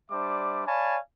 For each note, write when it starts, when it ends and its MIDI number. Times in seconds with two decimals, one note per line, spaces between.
0.11 0.65 55
0.11 0.65 62
0.11 0.65 72
0.11 0.65 74
0.11 0.65 76
0.11 0.65 86
0.67 0.97 73
0.67 0.97 74
0.67 0.97 77
0.67 0.97 80
0.67 0.97 81
0.67 0.97 83